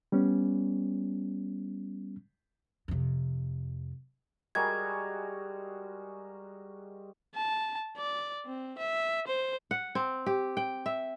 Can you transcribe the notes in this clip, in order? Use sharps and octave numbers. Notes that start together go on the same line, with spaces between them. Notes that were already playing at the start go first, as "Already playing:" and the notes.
G3 B3 C#4
F2 C3
G3 G#3 F#4 G#4 A#4 G#6
A5
D5
C4
E5
C5
F#5
C4
G4
G5
E5